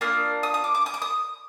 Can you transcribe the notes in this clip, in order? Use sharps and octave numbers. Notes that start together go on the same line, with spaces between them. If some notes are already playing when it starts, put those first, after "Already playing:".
A#3 D4 F4 D#6
D#6
D#6
D6
D6
D#6
D6
D#6